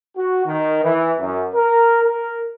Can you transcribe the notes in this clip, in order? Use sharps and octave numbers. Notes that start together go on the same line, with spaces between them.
F#4
D#3
E3
F#2
A#4
A#4